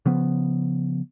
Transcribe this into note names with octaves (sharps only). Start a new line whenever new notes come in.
C#3 F3 B3